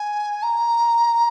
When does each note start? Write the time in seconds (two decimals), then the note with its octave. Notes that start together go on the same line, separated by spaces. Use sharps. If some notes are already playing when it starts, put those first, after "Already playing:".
Already playing: G#5
0.42 A#5